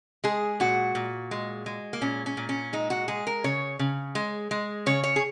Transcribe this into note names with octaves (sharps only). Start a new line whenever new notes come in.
G#3 G#4
A#2 F#4
A#2
G#3
G#3
A#3
A#2 C#4
C#4
A#2
C#4
G#3 D#4
F#4
G#3 G#4
A#4
C#3 C#5
C#3
G#3
G#3
C#3 C#5
C#5
G#4